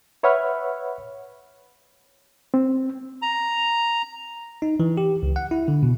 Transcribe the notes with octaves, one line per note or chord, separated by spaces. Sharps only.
B4 C#5 E5 F#5 B5 F6
C4
A#5
D#4
E3
G4
C#2
F#5
E4
D3
B2